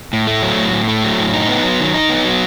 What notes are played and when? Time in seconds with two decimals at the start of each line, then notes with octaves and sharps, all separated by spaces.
0.13 A2
0.27 A3
0.43 F#3
0.59 A2
0.73 A2
0.88 A3
1.04 F#3
1.19 A2
1.33 D#4
1.49 B3
1.64 F#3
1.80 D#3
1.94 D#4
2.09 B3
2.25 F#3